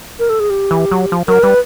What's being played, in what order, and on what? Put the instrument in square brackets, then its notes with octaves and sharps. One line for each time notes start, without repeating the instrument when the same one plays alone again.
[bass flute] A#4
A4
G#4
G4
[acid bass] E3
F#3
F3
[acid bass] F#3 [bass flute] A#4
[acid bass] G3 [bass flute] B4